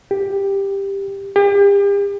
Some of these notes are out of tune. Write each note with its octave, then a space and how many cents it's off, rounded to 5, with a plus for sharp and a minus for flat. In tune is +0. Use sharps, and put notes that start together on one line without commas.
G4 +10
G4 +40